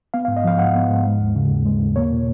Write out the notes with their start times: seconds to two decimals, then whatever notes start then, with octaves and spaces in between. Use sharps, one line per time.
0.14 B3 F5
0.25 F5
0.28 G#2
0.37 D#5
0.44 F3 F5
0.59 G#2 F#5
0.75 B3
0.90 G#2
1.05 G#3
1.20 D#2
1.36 C#3
1.50 D#2
1.66 G#3
1.81 D#2
1.96 A#3 C#5
2.12 A#2